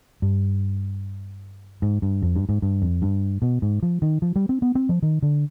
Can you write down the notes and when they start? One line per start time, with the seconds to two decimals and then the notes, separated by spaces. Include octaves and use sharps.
0.22 G2
1.82 G#2
2.02 G2
2.22 F2
2.36 G2
2.49 G#2
2.62 G2
2.82 F2
3.02 G2
3.42 B2
3.62 G#2
3.83 F3
4.02 D#3
4.22 F3
4.36 G3
4.49 C4
4.62 B3
4.75 C4
4.89 F3
5.02 D#3
5.22 D3